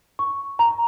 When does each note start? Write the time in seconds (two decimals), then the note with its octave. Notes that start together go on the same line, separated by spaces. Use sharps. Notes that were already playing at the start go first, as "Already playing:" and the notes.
0.19 C#6
0.59 A#5